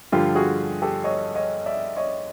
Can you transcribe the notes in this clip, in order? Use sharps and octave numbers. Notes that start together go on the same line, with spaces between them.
G2 D3 F3 F4 G4
F#4 G#4
G4 A4
C#5 D#5
C#5 D#5
D5 E5
C#5 D#5